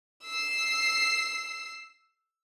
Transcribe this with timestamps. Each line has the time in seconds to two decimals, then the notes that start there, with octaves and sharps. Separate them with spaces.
0.24 E6 C7